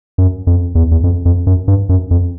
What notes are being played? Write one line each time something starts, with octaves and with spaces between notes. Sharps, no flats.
F#2
F2
E2
E2
F2
F2
F#2
G2
F#2
F2